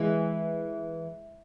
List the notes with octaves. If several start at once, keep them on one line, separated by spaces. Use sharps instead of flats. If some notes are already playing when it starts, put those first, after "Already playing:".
Already playing: E3 G#3